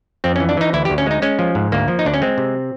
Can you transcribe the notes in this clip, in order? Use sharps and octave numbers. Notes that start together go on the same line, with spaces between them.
F2 C4
C#4
E3
D4
E3 D#4
D2 E4
G4
D2
C#4
G#3 D#4
G#3 C#4
F3
G#2
D2 A#3
F3
D#4
D2 D4
C#4
G#3 C4
C3